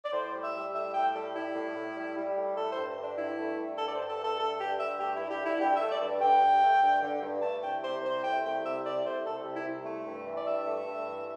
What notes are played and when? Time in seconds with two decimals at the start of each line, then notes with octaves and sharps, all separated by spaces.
0.04 D5
0.13 A2 C5
0.33 G3
0.44 E5
0.54 G3
0.73 A2 E5
0.94 A2 G5
1.14 G3 A4
1.35 G3 E4
1.54 A2
1.75 A2
1.95 G3
2.16 G3
2.37 A2
2.57 A3 A4
2.71 C5
2.76 G2
2.97 D3
3.02 D4
3.17 G2 E4
3.38 A3
3.57 G2
3.77 D3 A4
3.87 D5
3.94 C5
3.99 G2
4.08 A4
4.18 A3
4.23 A4
4.38 G2 A4
4.59 D3 G4
4.79 G2 E5
5.00 A3 G4
5.15 G2 E4
5.30 G4
5.40 D3
5.45 E4
5.60 G2 G4
5.75 A3 E5
5.90 D5
6.00 G2
6.21 D3 G5
6.41 G2
6.62 A3
6.81 G2
7.02 D3
7.21 G2
7.42 A3 A5
7.62 C2 G5
7.83 C3 C5
8.03 C2 C5
8.24 A3 G5
8.43 C2 G5
8.64 C3 E5
8.84 C2 D5
9.04 A3 C5
9.24 C2 A4
9.45 C3
9.55 E4
9.65 C2
9.85 A3
10.06 G2
10.26 E3
10.36 D5
10.46 G2 E5
10.66 A3
10.86 G2
11.07 E3